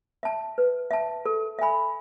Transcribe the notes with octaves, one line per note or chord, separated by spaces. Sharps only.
E5 A5
B4
E5 A5
A4
E5 G#5 B5